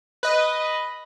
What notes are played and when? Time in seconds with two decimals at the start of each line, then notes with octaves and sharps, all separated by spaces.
0.23 B4 D#5